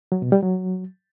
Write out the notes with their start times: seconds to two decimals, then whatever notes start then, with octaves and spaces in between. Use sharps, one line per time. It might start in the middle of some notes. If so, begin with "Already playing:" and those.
0.12 F#3
0.22 B2
0.32 G3
0.42 F#3